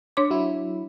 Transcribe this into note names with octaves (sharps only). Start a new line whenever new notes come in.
D4 C#5 D6
F#3 E4